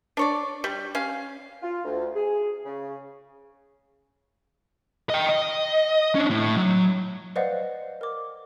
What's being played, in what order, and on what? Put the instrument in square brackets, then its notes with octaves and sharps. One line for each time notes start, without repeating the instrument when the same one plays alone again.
[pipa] D4 C#5 D5
G3
C#4 F5
[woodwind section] F4
D2
G#4
C#3
[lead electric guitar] D#5 G5
D#5
C#4 D4
A2
F#3
[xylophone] B4 C5 D5 D#5 F5 F#5
A#4 D6